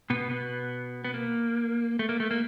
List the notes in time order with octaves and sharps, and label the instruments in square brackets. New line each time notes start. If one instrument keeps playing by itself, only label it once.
[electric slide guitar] B2 B3
B2 B3
B3
A#3
A3
A#3
A3
A#3